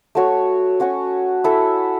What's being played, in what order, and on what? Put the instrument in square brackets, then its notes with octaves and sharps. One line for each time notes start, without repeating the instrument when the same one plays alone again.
[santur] A3 F#4 C#5
C#4 F#4 C#5
E4 A4 E5